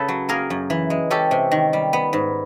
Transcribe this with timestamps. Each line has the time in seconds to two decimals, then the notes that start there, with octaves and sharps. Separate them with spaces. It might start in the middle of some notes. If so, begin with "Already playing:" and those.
Already playing: C#3 A4 B4
0.08 F#3
0.29 A#3 G#4 A#4
0.50 F#2
0.70 E3
0.90 G#3
1.10 C#4 G4 A4
1.31 C3
1.51 D#3
1.73 G3
1.93 B3
2.13 G#2